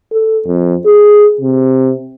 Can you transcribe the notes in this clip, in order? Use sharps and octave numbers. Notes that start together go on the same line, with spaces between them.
A4
F2
G#4
C3